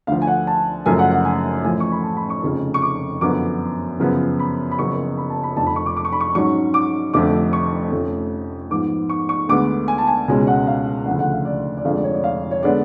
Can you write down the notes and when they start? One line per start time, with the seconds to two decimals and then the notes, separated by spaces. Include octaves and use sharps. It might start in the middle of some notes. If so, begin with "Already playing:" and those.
0.07 D2 D3 F3 F5
0.22 G#5
0.27 F#5
0.47 A5
0.86 F#1 F#2 F3 A3 G#5
0.99 F#5
1.11 F#5
1.25 G#5
1.64 A1 A2 F3 G#5
1.80 C#6
1.92 B5
2.03 A5
2.17 B5
2.30 C#6
2.43 F1 F2 C#3
2.74 C#6
2.82 D6
3.21 F#2 D3 F3 B3 D6
4.00 F#2 C#3 F3 B3
4.39 B5
4.71 B5
4.79 F#1 F#2 F3 B3 C#6
5.18 B5
5.30 A5
5.43 B5
5.57 F1 F2 D3 A5
5.66 B5
5.76 C#6
5.86 D6
5.97 D6
6.05 C#6
6.12 B5
6.20 C#6
6.35 G#2 F#3 C#4 C#6
6.74 D6
7.14 F1 F2 D3 F3 A3 D6
7.53 C#6
7.92 F1 F2 F3 A3 C#4
8.71 G#2 F3 B3 D6
9.10 C#6
9.29 C#6
9.49 D2 D3 G#3 B3 D6
9.88 G#5
9.98 A5
10.07 G#5
10.28 C#2 B2 G#3 C#4 G#5
10.47 F#5
10.67 F5
11.06 D2 C#3 F3 A3 F#5
11.19 F#5
11.33 F5
11.45 D5
11.77 D5
11.84 F1 F2 D3 G#3 F5
11.94 D5
12.04 C#5
12.14 D5
12.24 F5
12.51 C#5
12.63 D3 G#3 B3 D5